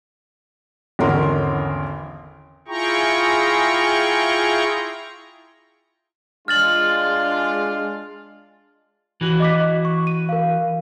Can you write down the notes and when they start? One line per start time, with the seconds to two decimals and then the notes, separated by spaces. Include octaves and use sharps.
0.99 G#1 E2 D3 C#4 A#4 C6
2.68 E4 F4 G#4 G5 A#5 C#6
6.48 G#3 D4 F4 F6 A6 F#7
9.21 E3 F#4
9.40 D#5 D6 B6
9.85 C#6
10.07 D#7
10.29 A#4 F5